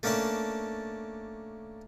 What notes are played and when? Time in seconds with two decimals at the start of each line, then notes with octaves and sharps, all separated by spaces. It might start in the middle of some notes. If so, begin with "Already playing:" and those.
0.03 A3 A#3 C#4 D4 A5